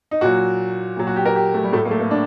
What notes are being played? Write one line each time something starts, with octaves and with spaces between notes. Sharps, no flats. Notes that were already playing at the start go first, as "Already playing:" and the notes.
D#4
A#2 F#3 F#4
A#2 F#3
F#4
G4
A#4
G4
A3
G3
A2 F#3 A3
A#3
A3
A#3
D4